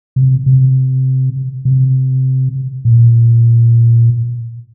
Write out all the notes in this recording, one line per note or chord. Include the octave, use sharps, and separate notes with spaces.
C3
C3
C3
A#2